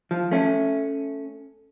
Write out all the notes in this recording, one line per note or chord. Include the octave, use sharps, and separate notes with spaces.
F3
A3 C#4